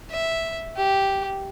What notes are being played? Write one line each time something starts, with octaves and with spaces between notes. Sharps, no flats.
E5
G4